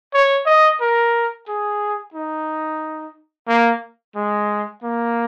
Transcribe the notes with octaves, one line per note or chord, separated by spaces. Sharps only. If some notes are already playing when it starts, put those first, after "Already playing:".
C#5
D#5
A#4
G#4
D#4
A#3
G#3
A#3